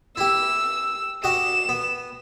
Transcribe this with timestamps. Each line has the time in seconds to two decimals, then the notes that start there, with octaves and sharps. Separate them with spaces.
0.17 E4 G4 E6
1.24 F#4 G4 D#5 E7
1.69 B3